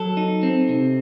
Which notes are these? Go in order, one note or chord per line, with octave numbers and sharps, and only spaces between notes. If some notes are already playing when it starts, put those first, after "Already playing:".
Already playing: F#3 A4
D#4
C4
C3